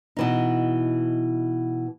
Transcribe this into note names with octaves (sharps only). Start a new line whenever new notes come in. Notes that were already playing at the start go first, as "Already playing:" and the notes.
B2 E3 D#4